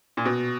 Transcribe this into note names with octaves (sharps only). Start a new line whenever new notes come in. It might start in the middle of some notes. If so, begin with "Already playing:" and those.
A#2
B2